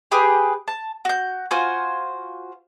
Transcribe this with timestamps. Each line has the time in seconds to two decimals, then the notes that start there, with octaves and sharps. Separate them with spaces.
0.12 G4 G#4 B4 G5
0.68 A5
1.05 F#4 G6
1.51 F4 F#4 C5 G#5